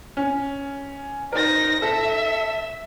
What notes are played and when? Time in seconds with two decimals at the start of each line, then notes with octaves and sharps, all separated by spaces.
0.17 C#4
1.33 D#4 A#4 C5 A#6
1.82 A4 E5